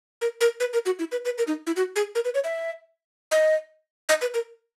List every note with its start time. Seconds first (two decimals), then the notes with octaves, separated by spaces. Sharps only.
0.21 A#4
0.41 A#4
0.60 B4
0.73 A#4
0.86 F#4
0.99 E4
1.12 B4
1.25 B4
1.38 A#4
1.47 D#4
1.67 E4
1.76 F#4
1.96 G#4
2.15 A#4
2.25 B4
2.35 C#5
2.44 E5
3.31 D#5
4.09 D#5
4.21 B4
4.34 A#4